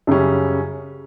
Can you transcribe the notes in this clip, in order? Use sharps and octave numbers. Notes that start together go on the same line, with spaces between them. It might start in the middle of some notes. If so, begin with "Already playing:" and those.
F#2 C#3 G3 C#4